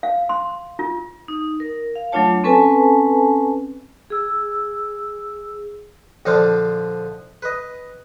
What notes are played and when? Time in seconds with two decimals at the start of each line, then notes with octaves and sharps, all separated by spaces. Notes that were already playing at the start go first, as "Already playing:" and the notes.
0.03 F5
0.29 C6
0.79 F4
1.28 D#4
1.60 A#4
1.95 F5
2.12 F#3 A3 D4 F4 C#5 A5
2.44 C4 C#4 A4 B4 G#5 A5
4.10 G#4 E6
6.25 A#1 D3 F3 D4 C5 F5
7.42 B4 D#5